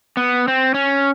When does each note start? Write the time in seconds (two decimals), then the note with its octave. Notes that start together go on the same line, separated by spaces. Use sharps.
0.17 B3
0.48 C4
0.74 C#4